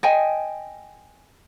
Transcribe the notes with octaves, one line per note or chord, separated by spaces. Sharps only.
D#5 G5 G#5